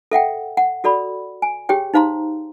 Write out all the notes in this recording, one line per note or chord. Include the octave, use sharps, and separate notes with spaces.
A4 E5 F#5 G5
F#5
F#4 A4 D5 B5
G#5
G4 G#4 C#5 G5
D#4 C5 F5 A#5 C6